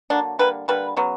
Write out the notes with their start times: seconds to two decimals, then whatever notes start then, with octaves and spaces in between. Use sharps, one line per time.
0.10 D3 F#3 A#3 D4
0.39 D3 G3 A#3 B4
0.68 D3 G3 A#3 B4
0.97 C#3 F#3 B3